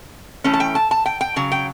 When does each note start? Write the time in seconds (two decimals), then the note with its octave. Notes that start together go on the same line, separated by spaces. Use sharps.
0.44 E3 A3 C#4
0.54 A5
0.60 G5
0.75 A5
0.91 A5
1.06 G5
1.21 G5
1.36 C#3 F#3
1.52 G5